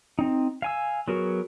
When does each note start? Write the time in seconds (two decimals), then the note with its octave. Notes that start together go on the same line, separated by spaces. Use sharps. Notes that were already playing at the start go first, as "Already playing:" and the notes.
0.19 C4 D#4
0.62 F5 G#5 E6
1.08 F#3 B3 F#4 G#4 A#4